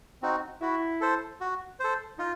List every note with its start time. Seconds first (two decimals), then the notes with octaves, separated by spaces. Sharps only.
0.22 C4 D#4 F#4
0.62 E4 F#4
1.01 A4 C5
1.41 F#4
1.80 A4 C5
2.19 D#4 F4